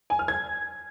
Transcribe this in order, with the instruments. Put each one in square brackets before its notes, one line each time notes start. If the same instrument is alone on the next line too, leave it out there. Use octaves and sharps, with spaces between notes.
[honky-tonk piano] G#5
F6
G#6